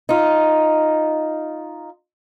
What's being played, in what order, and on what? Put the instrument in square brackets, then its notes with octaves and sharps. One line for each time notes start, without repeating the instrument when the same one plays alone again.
[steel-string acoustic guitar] D#4 F4